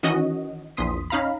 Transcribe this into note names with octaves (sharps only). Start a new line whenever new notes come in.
D#3 E3 C#4 F#4 D#5
A#1 E2 C6 D#6 B6
C#4 D#4 F5 A#5 B5